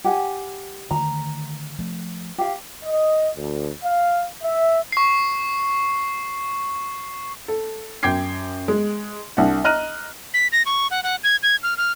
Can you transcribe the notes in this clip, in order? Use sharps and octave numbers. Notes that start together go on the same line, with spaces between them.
G4 F#5 G#5
D3 D#3 A3 A#5
F3 A3
G4 F5
D#5
D2
F5
E5
C#6 C7
A4
F#2 G5 D6 G#6 C7
G#3
C2 D4 F#5
D#5 A#5 F6 F#6 D#7
B6
A#6
C#6
F#5
F#5
G#6
G#6
F6
F6